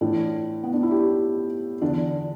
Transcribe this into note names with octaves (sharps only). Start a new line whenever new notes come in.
A2 E3 D4
B3
D4
E4
G4
E2 D3 D4